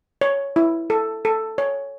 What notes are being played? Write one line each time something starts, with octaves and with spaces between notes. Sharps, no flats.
C#5
E4
A4
A4
C#5